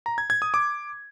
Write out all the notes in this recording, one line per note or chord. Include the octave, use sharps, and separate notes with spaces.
A#5
G#6
G#6
D#6
D6